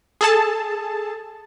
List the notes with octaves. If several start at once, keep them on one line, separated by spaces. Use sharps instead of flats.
G#4 A4 A5